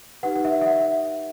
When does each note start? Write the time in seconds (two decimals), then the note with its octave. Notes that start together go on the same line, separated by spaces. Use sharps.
0.23 D#4 G4 B4 F#5
0.36 F#5
0.45 E5
0.61 E5
0.66 F#5